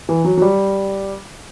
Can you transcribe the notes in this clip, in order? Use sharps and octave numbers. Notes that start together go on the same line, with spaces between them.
E3
F#3
F#3
G3